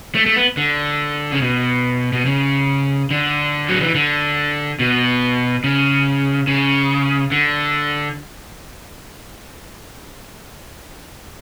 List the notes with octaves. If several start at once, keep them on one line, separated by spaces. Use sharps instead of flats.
A3
A3
B3
D3
C#3
B2
B2
C#3
D3
F#3
E3
D3
B2
C#3
C#3
D3